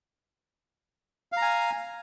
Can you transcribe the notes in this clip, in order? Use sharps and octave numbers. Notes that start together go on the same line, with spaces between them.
F5 G#5 A#5